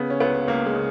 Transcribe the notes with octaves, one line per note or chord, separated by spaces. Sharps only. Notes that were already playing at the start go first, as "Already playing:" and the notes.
Already playing: C#3 B3
C#4
C#2 B3
C#2 A#3
G#3
C#3